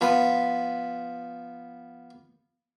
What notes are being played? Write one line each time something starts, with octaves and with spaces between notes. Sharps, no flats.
F3 B3 B5